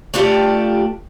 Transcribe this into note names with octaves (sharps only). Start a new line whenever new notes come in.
A3 D4 F4 G4